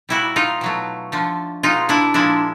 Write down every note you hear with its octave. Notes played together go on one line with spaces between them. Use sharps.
A#2 G3 E4 F#4
D#4 F4
B2 F#3 A3
D3 F3 A3
B2 G#3 D#4 F4
D4 E4
A#2 F3 G#3 D4 E4